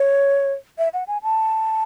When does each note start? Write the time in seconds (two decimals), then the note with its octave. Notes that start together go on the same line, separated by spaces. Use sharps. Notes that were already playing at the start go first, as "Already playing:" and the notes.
Already playing: C#5
0.78 E5
0.94 F#5
1.07 G#5
1.23 A5